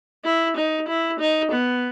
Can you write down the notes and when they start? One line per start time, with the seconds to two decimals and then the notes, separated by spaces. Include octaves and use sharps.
0.25 E4
0.57 D#4
0.89 E4
1.20 D#4
1.52 B3